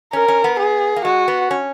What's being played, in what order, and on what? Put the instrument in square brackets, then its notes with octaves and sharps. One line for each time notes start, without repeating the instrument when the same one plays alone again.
[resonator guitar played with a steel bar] C#4 [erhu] A#4
[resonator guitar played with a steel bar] C#4
B3
[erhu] G#4
[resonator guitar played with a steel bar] A#3
[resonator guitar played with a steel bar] G#3 [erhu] F#4
[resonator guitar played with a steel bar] B3
C#4